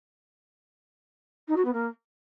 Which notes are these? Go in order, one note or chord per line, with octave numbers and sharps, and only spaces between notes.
D#4
F#4
B3
A#3